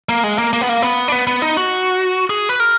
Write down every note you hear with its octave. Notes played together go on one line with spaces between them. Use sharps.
A#3
G#3
A#3
A#3
B3
A#3
B3
D4
B3
B3
D#4
F#4
G#4
B4
A#4